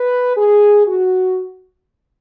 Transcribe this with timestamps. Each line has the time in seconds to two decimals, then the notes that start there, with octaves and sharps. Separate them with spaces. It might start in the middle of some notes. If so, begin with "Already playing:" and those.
Already playing: B4
0.37 G#4
0.87 F#4